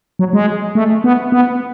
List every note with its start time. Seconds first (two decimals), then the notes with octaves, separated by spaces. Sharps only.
0.19 F#3
0.33 G#3
0.75 A3
1.04 B3
1.32 B3